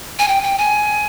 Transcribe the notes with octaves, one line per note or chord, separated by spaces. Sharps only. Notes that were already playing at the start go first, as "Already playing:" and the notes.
G#5
G5
G5
G#5